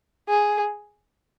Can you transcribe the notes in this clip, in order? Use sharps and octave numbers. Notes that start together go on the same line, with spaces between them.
G#4